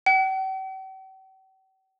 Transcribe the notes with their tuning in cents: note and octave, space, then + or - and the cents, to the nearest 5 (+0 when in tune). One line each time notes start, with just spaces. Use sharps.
G5 -45